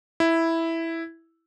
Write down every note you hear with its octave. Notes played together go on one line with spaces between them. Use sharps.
E4